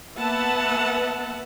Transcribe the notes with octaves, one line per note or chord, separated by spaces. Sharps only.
A#3 B3 B4 E5 F#5 A5